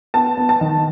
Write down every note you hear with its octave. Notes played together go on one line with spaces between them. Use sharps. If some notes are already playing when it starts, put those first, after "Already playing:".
B3 A5
B3
A5
D#3